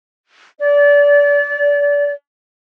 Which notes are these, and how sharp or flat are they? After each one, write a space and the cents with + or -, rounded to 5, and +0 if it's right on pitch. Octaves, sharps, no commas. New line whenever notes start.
D5 -30